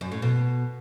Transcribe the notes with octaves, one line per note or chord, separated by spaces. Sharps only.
F#2
A2
B2